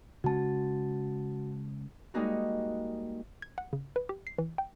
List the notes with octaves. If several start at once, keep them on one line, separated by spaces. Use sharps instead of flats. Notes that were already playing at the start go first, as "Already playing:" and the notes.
C#3 G#3 C#4 F#4 A5
G3 G#3 A#3 D#4 F#4
G#6
F#5
C#3
B4
G4
C7
E3
G5